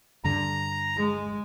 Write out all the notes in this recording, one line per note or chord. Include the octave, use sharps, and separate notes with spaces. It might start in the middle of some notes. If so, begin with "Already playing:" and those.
G2 D3 A#5
G#3